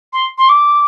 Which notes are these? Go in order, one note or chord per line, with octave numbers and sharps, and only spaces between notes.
C6
C6
D6